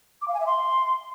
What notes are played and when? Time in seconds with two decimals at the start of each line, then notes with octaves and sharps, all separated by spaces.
0.22 D6
0.28 F5
0.34 G#5
0.40 E5
0.47 C6